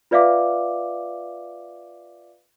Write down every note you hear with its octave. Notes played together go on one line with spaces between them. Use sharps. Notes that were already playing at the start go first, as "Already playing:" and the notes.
F4 B4 D5 E5 F5 D6